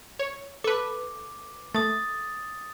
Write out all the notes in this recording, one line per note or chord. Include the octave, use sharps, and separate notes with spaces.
C#5
A4 B4 D6
A3 D#6 A6